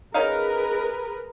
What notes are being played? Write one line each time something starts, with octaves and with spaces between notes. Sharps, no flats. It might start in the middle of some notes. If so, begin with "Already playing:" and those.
C#4 D#4 G#4 A#4 B4 F5